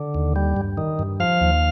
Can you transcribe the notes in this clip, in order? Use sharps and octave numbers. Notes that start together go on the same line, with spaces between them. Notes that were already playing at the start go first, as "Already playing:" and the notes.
Already playing: D3
D#2
G3
G2
D#3
G2
F3 F5
D#2